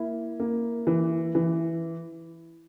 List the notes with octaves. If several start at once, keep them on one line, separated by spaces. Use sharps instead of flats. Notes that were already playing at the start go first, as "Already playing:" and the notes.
Already playing: A#3 E4
A#3
E3
E3